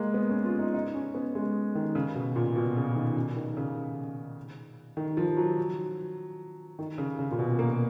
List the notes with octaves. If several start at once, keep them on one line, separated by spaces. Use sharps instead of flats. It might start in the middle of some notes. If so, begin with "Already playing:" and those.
Already playing: G#3 A#3
B3
C#4
F4
D#4
D#4
C#4
B3
G#3
D#3
C#3
B2
A#2
B2
C#3
D#3
C#3
D#3
C#3
D#3
F3
F#3
D#3
C#3
C#3
A#2
B2
A#3